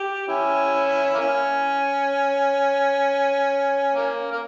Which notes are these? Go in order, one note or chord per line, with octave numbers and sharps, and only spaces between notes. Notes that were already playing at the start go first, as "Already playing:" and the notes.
Already playing: G4
C#4 E4
A#3
C#4
A#3
A#3